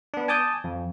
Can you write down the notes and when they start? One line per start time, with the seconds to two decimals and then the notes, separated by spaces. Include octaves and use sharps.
0.14 B3 D4
0.28 G#5 A5 D6 D#6 G6
0.64 F2